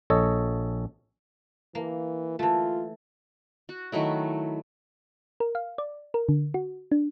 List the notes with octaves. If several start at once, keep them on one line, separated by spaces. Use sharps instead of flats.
A#1 A4 C#5 D#5
E3 A#3
E3 A3 F4
F#4
D#3 F#3 A3 E4
A#4
F5
D5
A#4
D3
F#4
D4